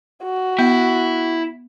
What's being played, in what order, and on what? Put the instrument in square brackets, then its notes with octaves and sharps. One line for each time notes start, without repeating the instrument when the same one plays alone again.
[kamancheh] F#4
[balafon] B3 [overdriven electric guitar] E4